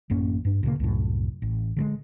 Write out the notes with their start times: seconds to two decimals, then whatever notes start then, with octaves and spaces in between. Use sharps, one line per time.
0.10 A1 F#2 A#3 C#4
0.45 G2 D4
0.63 D2 A#2 C#3 A#3
0.80 C2 F#2 A2
1.42 A1
1.77 D3 F#3 G#3